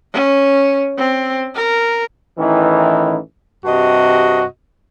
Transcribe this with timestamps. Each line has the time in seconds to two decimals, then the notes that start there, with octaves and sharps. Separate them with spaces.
0.13 C#4
0.98 C4
1.55 A#4
2.38 A1 D#3 E3
3.65 G2 C3 F#4 D#5